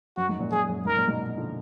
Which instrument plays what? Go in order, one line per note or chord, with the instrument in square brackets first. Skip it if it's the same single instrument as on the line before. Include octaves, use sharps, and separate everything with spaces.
[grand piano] F#2 [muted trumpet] F#4
[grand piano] G#2
F#2 A#2
[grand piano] F#2 [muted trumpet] G#4
[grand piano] F#2
[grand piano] G#2 [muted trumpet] A#4
[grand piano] F#2 A#2
G#2 B2
D3 F3